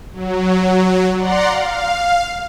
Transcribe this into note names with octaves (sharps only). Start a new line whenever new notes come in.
F#3
D5 F#5 A#5 C6
F5